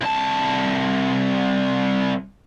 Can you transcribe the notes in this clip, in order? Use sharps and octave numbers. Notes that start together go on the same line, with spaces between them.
C2 A5